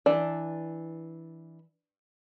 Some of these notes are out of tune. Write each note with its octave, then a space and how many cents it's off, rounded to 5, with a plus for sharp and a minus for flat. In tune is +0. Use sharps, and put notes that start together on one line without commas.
E3 -10 D4 +0 D5 +0